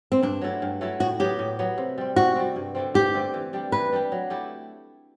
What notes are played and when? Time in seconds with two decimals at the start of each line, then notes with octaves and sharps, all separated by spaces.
0.12 C4
0.23 G2 D4
0.41 F#3 A3 E4
0.62 G2
0.81 F#3 A3 E4
1.00 A2 F#4
1.20 F#3 B3 G4
1.39 A2
1.59 F#3 B3
1.78 C3
1.98 G3 C4
2.16 C3 F#4
2.36 G3 C4
2.56 G2
2.75 D3 A3 C4
2.94 G2 G4
3.14 D3 A3 C4
3.34 E3
3.53 G3 D4 G4
3.72 E3 B4
3.92 G3 D4 G4
4.12 F#3
4.30 A3 E4 G4